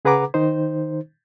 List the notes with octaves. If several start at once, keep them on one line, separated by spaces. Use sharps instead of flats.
C#3 G#4 B4 F#5 A#5 D6
D#3 D#4 C5